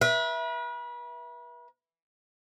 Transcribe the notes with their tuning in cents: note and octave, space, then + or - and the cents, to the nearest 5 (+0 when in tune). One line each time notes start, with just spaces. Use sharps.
B4 -40 E5 +0